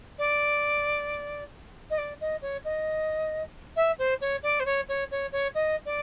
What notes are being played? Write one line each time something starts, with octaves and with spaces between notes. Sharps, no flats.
D5
D#5
D5
D#5
C#5
D#5
E5
C5
C#5
D5
C5
C#5
C#5
C#5
C#5
D#5
D5